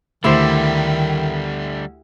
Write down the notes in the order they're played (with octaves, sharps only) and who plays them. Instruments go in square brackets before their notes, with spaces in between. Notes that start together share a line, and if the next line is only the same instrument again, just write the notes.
[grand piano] D2 [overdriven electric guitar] D3 G3 [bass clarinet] D#3 [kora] E4 G4 C5